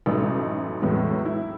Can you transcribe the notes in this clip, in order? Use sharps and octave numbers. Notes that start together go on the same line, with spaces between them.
A1 F#2 A3 D#4 D#6
E2 A2 F#3 G#3 B3
E4